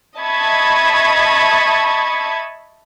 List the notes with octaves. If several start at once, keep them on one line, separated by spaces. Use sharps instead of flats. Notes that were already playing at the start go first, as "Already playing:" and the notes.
D#5 E5 A5 B5 C#6 G#6